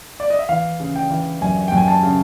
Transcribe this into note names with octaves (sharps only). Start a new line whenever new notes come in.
D5
D#5
E5
E3 F5
C#3
G5
E3
F#2 G#5
F#2 G5
G#5
A5
C#3